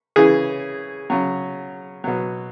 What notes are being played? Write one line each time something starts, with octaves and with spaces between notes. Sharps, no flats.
C#3 E3 G#4
C#3 F#3
B2 F#3